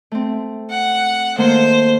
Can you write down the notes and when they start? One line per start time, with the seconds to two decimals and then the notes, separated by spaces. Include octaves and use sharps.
0.12 A3 C4
0.70 F#5
1.38 D#3 A3 A#3 C5